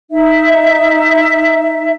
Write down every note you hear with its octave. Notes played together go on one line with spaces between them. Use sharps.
D#4 E5